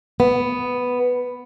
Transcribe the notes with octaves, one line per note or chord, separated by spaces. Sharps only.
B3